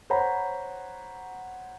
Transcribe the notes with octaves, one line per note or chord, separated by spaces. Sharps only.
C5 C#5 F#5 A#5 B5